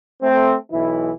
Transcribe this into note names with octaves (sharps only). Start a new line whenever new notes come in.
A3 C4
B1 E3 E4